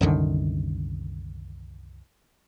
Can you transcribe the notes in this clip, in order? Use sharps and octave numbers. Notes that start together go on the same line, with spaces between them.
C2 F#2 D3 D#3